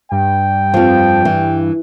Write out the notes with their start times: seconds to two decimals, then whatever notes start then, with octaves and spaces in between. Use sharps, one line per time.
0.12 G2 G5
0.74 F2 F3
1.25 E3